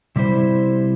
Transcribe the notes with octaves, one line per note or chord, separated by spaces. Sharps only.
C3 G3 E4 C5